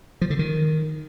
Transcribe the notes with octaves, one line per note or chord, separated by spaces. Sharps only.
F3
D3
D#3